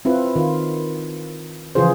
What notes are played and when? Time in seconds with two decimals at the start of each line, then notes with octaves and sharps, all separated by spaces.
0.05 C4 E4 F4 B4
0.36 D#3 F4
1.75 C#3 E3 F3 F4 G#4 C5